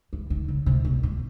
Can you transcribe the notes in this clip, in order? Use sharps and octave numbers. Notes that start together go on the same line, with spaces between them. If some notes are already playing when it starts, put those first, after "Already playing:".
E3
D#3
C#3
C3
B2
A#2